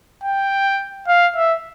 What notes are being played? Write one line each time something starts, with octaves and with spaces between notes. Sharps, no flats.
G5
F5
E5